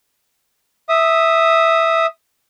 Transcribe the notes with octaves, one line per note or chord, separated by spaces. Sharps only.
E5 D#6